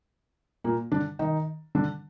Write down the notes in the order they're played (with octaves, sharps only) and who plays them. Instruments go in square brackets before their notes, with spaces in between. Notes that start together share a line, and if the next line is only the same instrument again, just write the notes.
[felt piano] A#2 A#3
D3 D4
D#3 D#4
D3 D4